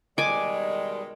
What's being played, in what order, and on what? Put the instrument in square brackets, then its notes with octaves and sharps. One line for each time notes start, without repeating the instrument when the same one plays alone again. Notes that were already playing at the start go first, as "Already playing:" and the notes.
[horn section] B2 D#3 G#3 [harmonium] G3 [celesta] D#5 [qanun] G#5 D6